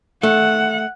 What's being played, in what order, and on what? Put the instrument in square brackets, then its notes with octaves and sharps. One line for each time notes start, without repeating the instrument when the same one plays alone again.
[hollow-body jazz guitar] A3 [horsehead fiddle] F#5